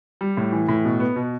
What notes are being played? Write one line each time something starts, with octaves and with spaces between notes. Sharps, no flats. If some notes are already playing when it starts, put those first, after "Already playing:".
G3
A2
E3
A2
B2
B3
B2